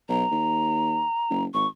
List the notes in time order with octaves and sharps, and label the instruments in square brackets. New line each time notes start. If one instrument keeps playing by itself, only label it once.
[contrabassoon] B1 [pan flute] A#5
[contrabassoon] D#2
F#1
[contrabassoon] G#1 [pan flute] C#6